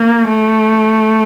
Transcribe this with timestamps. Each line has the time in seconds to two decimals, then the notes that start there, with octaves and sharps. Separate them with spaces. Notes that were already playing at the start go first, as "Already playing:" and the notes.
Already playing: A#3
0.28 A3